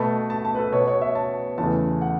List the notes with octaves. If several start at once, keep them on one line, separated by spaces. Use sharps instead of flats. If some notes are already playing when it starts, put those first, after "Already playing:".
Already playing: B2 A3 B5
A5
A5
B4
A4
B2 B3 C#5
C#5
E5
A5
E2 C#3 A3 A5
F#5